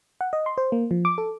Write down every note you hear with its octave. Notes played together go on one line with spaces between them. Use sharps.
F#5
D#5
C6
C5
A#3
F3
D6
A4